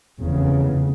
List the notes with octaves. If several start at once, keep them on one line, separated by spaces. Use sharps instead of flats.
F1 E2 C#3